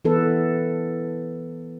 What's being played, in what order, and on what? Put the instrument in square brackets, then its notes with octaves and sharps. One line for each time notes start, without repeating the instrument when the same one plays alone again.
[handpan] E3 B3 A4 B4